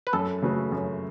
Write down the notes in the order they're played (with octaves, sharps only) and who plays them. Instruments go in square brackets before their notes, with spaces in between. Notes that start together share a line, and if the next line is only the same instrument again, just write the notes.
[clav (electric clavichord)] B4
[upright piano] F#2 [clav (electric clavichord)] A4
[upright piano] C#3 A3 F#4 B4
F#2